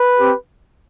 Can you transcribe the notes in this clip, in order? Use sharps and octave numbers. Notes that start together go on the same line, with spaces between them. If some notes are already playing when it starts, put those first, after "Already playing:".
Already playing: B4
C4 G4